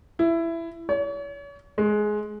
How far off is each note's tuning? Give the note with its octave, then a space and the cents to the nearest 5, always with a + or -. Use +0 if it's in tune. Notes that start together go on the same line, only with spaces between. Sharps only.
E4 +15
C#5 +40
G#3 +15